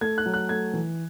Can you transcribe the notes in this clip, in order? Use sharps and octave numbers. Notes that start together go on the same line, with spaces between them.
A3 G#6
F#6
F#3
F#6
A3 G#6
E3